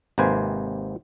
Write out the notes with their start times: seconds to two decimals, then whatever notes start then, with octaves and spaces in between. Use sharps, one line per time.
0.18 G#1 C3 A#3 B4 C5 G#5